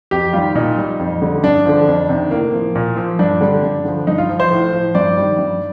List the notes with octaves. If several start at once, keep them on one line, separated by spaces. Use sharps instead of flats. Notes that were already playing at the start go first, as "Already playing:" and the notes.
F2 G4
D#3 G3 F4
A#2 D#4
G3
F2
D3 G3
G2 D4
D3 F3
F2
C3 D#3
A2 A#3
F3
A#2
F3
G2 D4
D3 G3
G2
D3 F3
G2 D#4
F4
F3
C5
A2
F3
G2 D5
D#3 G3
G2